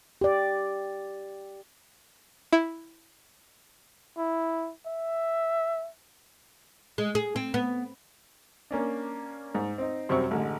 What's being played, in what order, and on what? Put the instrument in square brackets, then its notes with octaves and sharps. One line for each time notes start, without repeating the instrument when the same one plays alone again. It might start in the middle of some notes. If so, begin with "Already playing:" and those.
[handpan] G4 D5
[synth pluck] E4
[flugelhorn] E4
E5
[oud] G#3
G#4
C4
B3
[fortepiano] A#3 C#4 D4
G#2
C4 D#4
F#2 C3 G3 C4 C#6
A1 D3 G#3